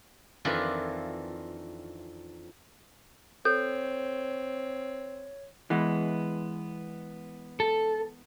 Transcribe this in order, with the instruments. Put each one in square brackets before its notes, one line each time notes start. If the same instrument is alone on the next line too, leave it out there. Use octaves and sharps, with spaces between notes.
[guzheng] F2 D#3 E3 D4 E4 F4
[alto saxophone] C4 [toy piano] A4 [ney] C#5 [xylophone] G6
[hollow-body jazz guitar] E3 G#3 B3
[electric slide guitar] A4